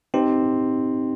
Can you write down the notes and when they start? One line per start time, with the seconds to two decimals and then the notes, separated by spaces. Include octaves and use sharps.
0.14 C4 D#4 G4